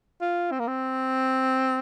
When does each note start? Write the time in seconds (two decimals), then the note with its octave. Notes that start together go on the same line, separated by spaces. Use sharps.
0.21 F4
0.51 C4
0.59 A#3
0.68 C4